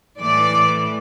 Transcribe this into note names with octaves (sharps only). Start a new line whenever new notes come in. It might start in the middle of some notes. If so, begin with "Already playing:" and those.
A2 E3 A3 D5